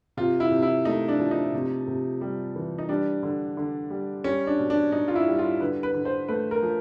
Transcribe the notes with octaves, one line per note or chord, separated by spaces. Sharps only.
C3 F4
E4
C3
E4
A3 D#4
D4
F3
D#4
C3
C3
G3
E3
D#4
G3 D4
D3
D3
G3
G3 C#4
D4
B2
D4
B2 D#4
F4
E4
G3
F4
D3 B4
B4
D3
C5
A3 B4
A#4
F3